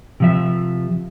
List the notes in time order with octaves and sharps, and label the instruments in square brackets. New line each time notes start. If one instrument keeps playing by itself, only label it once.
[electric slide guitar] C3 F3 E5